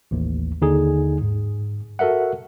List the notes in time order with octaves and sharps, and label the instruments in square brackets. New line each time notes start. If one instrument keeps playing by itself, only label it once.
[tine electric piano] A1 D#2
D#2 D3 D#4 G#4
G#2
F#4 A4 A#4 E5 F#5